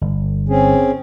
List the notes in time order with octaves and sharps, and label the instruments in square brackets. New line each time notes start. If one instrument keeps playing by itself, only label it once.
[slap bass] G1
[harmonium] C4 C#4 G#4